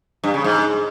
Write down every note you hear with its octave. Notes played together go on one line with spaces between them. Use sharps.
G2
C#3
G#2